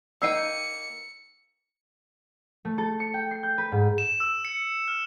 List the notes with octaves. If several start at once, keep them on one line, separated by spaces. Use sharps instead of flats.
A#3 D#4 G5 E6 C7 C#7 D#7
A3
A4
C#7
G5
C7
G6
B4
G#2
E7
E6
C#7
F6